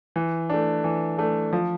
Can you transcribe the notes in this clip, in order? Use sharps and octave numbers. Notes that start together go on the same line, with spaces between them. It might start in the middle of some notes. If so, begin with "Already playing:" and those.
E3
A3 D4
E3
A3 D4
F3